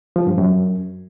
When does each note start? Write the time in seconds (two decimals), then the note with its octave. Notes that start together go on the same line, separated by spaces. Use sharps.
0.16 F3
0.27 G2
0.38 F#2